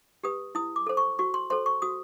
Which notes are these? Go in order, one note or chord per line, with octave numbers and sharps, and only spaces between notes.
G4 B4 D#6
E4 D#6
D6
A4 C5
C#6
F#4 C#6
C6
A4 C5 C6
C#6
F#4 D#6